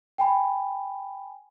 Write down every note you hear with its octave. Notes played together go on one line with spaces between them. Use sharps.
G5 G#5 B5